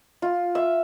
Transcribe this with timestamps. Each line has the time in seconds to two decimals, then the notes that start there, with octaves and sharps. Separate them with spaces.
0.22 F4
0.55 E5